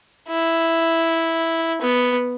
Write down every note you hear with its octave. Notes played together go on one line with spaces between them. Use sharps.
E4
B3